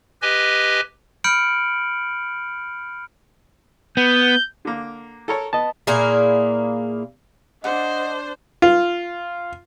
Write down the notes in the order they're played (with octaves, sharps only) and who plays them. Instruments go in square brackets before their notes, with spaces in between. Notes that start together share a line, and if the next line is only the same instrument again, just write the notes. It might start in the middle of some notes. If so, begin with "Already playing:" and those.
[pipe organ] G4 B4 D#5 G#5
[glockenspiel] B5 F6 G6 C#7 D7 F#7
[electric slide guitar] B3 [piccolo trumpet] G6
[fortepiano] D3 A#3
A4 A#4 C#5
[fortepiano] B3 [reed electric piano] D#5 A5
[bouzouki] A#2 A#3 E4 G#4
[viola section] D4 [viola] C5 [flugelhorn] D#5 [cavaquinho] F#5
[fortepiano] F4